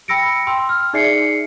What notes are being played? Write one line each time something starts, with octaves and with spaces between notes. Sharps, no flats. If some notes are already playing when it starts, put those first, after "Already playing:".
G5 B5 E6 A#6 C#7 D7
G5 C6 E6
F6
D#4 G#4 D5 E5 C7 C#7